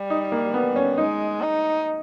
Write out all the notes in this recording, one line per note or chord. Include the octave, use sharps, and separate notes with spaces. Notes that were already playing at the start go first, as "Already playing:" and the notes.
Already playing: G3
D#4
A#3
B3
C#4
G#3 D#4
D#4